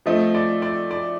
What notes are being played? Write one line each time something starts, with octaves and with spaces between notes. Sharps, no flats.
F3 A3 C4 D#5
D5
D5
D5